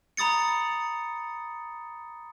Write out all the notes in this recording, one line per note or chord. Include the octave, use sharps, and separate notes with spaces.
A#5 B5 D#6 A6 C#7